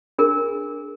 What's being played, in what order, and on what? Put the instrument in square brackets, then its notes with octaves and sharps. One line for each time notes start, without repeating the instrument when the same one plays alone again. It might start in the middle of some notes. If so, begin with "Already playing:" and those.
[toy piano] D4 G#4 A#4